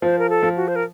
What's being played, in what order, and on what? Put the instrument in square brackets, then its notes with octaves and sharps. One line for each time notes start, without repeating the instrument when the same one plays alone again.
[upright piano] F3 [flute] C5
[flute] A#4
A4
[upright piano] F3
[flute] F#4
C5
A#4